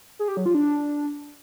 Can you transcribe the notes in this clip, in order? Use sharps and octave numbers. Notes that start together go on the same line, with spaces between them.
G#4
G4
F#3
F4
D4